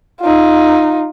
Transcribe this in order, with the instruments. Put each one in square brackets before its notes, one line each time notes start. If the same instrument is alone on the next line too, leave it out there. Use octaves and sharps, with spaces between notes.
[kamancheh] D#4 F4